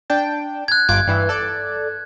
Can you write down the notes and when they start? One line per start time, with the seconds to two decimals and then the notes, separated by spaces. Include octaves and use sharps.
0.10 D4 G5 A5
0.68 F#6 G#6
0.89 G1 F4 D6 G#6
1.07 G2 E3 E4
1.29 A4 D5